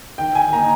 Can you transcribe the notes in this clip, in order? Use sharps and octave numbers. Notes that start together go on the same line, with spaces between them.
D#3 G5
G#5
A#3 D#4 A#5